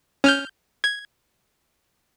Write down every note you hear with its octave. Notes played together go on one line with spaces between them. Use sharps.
C#4 F6 G6
G#6